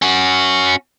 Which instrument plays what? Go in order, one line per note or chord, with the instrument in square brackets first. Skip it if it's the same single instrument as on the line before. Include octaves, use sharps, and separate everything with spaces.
[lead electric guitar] C#4 F#4